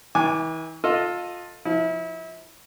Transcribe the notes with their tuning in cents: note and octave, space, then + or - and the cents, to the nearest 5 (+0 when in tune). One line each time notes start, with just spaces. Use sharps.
E3 -40 G#5 +0 D6 +0
F4 +20 A4 +10 D#5 +0
F3 +0 E4 -30